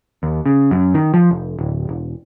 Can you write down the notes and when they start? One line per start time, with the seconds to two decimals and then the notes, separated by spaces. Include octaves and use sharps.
0.23 D#2
0.46 C#3
0.71 F#2
0.94 D#3
1.14 F3
1.31 F1
1.59 D1
1.89 E1